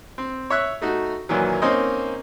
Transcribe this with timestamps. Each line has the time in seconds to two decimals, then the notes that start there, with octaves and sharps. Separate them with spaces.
0.18 C4
0.50 C#5 E5 F#6
0.81 A3 D#4 F#4
1.29 F#2 A#2 D#3 E3 F#3
1.62 A#3 C4 C#4 D#4 C5 D#5